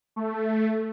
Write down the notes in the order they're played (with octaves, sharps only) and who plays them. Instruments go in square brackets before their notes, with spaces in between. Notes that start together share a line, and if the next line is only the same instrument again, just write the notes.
[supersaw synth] A3